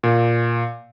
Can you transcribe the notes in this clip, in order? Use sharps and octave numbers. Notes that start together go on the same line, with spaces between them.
A#2